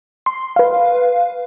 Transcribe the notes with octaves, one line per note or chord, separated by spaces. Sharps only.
C6
B4 F5